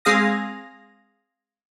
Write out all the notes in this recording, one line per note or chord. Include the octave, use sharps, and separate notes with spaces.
G#3 C4 G#4 F5 D#6 A#6